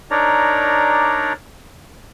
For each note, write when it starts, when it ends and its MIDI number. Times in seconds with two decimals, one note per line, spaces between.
0.11 1.33 62
0.11 1.33 63
0.11 1.33 70
0.11 1.33 73
0.11 1.33 74
0.11 1.33 82